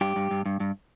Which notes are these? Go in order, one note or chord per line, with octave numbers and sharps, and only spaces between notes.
G2 G4
G2
G2
G2
G2